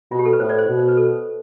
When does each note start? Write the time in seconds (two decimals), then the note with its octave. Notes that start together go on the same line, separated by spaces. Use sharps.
0.11 B2 F4
0.19 G4
0.25 A4
0.33 B4
0.40 A2 C5
0.49 D5
0.58 C5
0.68 B2
0.79 C5
0.88 B4
0.97 A4